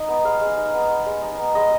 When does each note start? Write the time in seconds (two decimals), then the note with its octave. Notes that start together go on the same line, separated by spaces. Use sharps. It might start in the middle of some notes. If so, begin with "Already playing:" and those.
Already playing: D#4 D#5
0.09 B3
0.25 G#3 F5
0.41 G#3
0.57 D#4
0.74 B3
0.90 G#3
1.06 G#3
1.22 D#4
1.39 B3
1.55 G#3 D#5